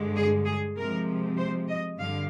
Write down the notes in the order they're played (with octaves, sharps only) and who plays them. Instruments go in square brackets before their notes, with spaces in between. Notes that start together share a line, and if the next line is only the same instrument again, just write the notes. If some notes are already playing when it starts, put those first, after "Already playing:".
Already playing: [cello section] G2 D3 G#3
G#4
G#4
C3 F3 G#3 A#4
C5
D#5
G2 D3 F5